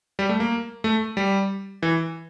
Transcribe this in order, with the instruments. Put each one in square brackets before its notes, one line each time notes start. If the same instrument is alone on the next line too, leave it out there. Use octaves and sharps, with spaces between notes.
[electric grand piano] G3
A3
A#3
A3
G3
E3